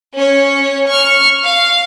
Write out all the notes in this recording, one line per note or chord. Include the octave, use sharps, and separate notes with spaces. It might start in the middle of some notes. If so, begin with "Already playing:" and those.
C#4 C#5
C#6 F6
F5